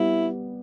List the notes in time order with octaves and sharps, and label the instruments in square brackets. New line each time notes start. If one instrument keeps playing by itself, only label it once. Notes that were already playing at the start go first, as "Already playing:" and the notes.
Already playing: [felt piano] G3 B3 [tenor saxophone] E4